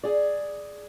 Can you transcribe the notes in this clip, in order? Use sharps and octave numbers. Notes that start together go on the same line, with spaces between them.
G#4 D5